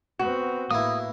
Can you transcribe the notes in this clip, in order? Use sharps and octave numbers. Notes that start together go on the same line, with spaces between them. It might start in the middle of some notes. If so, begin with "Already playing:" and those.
B3 C4 F#4
A2 A#3 B3 E4 D#6